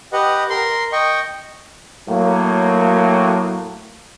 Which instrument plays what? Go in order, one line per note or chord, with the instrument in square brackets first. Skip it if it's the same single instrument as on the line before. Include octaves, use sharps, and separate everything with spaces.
[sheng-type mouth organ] G4 B4 D#5 F#5
A#4 C6
D#5 G5 C#6
[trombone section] A2 F#3 A#3